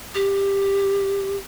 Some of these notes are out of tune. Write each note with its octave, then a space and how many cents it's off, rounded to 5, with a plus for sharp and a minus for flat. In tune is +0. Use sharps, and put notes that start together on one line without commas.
G4 +10